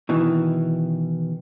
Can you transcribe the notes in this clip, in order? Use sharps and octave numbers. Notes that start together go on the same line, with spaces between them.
B2 D#3 E3